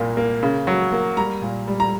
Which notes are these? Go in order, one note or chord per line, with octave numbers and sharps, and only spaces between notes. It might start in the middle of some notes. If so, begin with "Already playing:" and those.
Already playing: C2 A#2 A#3
A#3
C#3
F#3
A#3
G3 A#5
A#2
G3
A#5